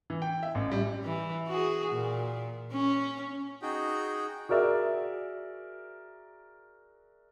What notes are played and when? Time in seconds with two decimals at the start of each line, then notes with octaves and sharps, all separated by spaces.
0.10 E3
0.22 G5
0.43 E5
0.55 A1
0.72 G3
1.04 E3
1.47 F#4 G#4
1.91 A#2
2.72 C#4
3.62 D#4 F#4 G#4 G5
4.49 F#4 G#4 A#4 D5 E5